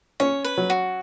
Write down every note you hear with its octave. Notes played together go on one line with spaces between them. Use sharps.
C#4 C#5
B4
F#3
F#4